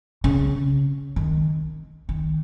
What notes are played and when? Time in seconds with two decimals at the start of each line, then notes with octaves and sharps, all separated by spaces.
0.24 C#3
1.16 D#3
2.09 D#3